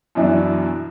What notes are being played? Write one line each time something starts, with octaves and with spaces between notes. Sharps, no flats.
F#2 B2 E3 D4 E4